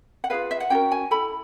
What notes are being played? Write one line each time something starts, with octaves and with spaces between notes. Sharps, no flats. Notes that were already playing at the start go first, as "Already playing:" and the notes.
F#5
F4 G#4 B4 F5
E5
F#5
C#4 F#4 A#4 G5
G#5
E4 A4 B5